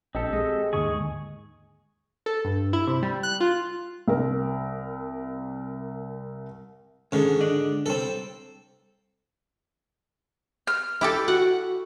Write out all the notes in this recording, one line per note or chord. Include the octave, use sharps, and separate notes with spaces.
A#1 C4 G4 A4 D#5
G#3 D#5
D#2 G#2 D3 G#4 C#6
A4
G2
E4
C3
G3
F#6
F4
C2 A#4
G#2 D3 D#3 C#4
D4 D5 D#5
C2 G3 C4 A4
F6
E4 G4 A4 D6
F#4 F#5